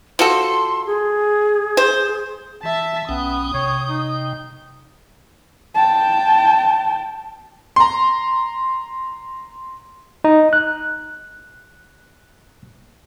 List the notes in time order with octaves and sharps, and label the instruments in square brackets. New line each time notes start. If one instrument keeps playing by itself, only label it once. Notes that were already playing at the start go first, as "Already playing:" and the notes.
[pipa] F3 F#4 A4 [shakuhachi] C6
[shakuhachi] G#4
[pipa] C5
[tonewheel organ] E3 [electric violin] E5 A5
[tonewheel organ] B1 C#4 G5 [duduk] B3 [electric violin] D#6
[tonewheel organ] C3 G5 [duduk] C#5
[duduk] D#4
[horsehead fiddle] G5 A5
[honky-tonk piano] A#5 C6
[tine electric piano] D#4
F#6